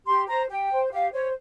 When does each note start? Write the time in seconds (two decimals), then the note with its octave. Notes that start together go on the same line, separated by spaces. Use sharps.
0.06 G4 C6
0.27 C5 A#5
0.48 G4 G5
0.70 C5
0.91 G4 F5
1.11 C5 C#5